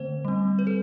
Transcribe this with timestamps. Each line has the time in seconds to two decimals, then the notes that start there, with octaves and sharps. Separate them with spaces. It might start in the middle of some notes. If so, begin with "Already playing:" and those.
Already playing: D3 A3 C4 C5
0.25 G3 C4
0.59 B4
0.67 A4